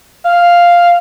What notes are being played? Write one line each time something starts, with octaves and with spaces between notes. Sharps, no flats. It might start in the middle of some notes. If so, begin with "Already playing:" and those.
F5